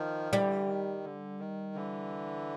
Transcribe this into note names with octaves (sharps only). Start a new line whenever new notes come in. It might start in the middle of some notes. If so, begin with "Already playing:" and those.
Already playing: D#3 F3
D3 E3 G3
D#3
D3
D#3
D3 E3